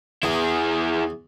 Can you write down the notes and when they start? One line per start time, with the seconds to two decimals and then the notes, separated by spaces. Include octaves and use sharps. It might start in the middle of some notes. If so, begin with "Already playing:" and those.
0.23 E2 E3 E4 G#4